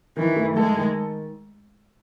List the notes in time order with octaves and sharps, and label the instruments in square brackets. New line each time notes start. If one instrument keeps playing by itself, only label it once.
[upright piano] D#3 [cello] E3
[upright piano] A3
[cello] G#3 [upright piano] A4
[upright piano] D#3